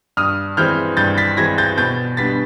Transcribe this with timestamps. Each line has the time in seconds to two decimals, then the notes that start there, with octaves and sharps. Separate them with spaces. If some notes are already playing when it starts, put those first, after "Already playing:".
0.17 G2 D#6 F6
0.57 E3 G#3 C4 F6 G6
0.97 G2 G6 A6
1.18 A6 B6
1.37 E3 G#3 C4 G#6 A#6
1.58 G6 A6
1.77 B2 G6 A6
2.17 G3 B3 D4 A6 B6